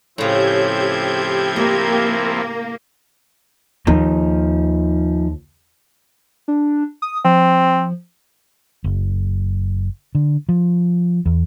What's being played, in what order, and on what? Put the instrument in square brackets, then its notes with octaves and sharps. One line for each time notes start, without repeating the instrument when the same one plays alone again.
[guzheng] A2 C#3 [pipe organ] F3 C4 E4 [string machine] G4 G6 G#6
[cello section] A#3 [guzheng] D#5
[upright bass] D#2 [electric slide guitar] F3 D#4
[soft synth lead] D4
D#6
[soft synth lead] F3 [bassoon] C4
[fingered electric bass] F#1
D3
F3
E2